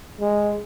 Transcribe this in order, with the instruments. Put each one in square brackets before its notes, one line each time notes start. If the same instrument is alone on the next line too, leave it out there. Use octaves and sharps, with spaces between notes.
[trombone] G#3